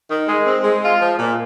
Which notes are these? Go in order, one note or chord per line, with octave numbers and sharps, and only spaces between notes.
D#3
G#3
C4
G#3
F4
F3
A#2